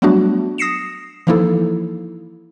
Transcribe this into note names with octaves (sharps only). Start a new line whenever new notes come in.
F#3 G3 A3 B3 D4 F#4
D#6 A#6 C7 C#7 E7
E3 F3 A#3 D#4 E4 A4